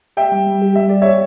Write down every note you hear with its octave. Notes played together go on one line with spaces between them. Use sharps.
G4 E5 G5
G3
G3
G4
G3 E5
G4 D5
G4 C#5 E5